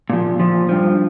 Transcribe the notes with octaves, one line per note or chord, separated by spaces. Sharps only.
A#2 F3
A#2 F3
G2 F3